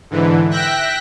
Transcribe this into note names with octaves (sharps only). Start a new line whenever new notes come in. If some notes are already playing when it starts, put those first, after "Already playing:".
G#2 D3 E3
E5 G5 F#6 A#6 B6